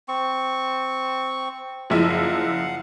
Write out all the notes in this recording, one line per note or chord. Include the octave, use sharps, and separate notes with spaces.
C4 C#6
F#1 F3 E4
F5 F#5